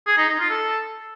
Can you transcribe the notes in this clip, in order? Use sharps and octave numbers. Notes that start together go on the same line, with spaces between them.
G#4
D#4
D#4
F4
A4